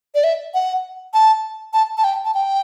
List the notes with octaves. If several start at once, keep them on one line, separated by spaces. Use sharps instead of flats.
D5
E5
F#5
A5
A5
A5
G5
A5
G5